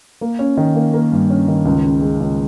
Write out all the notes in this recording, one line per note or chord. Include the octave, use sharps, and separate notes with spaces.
A#3
C#4
D#3
A#3
A#3
G2
C#4
D#3
C#2
C#3
G#3
C#2